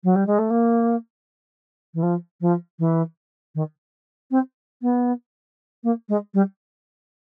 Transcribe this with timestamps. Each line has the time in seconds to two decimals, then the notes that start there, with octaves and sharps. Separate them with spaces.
0.03 F#3
0.15 G3
0.26 G#3
0.38 A3
0.50 A#3
1.94 E3
2.02 F3
2.41 F3
2.79 E3
3.55 D#3
4.31 C4
4.82 B3
5.83 A#3
6.09 G#3
6.34 G3